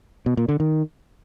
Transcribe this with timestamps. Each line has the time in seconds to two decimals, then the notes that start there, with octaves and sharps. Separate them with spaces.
0.26 B2
0.37 A#2
0.49 D3
0.60 D#3